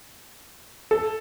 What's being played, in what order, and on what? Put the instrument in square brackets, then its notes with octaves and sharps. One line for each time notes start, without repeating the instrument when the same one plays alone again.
[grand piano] A4